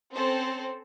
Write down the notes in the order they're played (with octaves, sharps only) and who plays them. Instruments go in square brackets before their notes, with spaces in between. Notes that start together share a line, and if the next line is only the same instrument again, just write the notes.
[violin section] C4 C#4 A4 C5